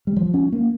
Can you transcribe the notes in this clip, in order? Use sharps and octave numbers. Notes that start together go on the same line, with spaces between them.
G3
F3
C#4
A#3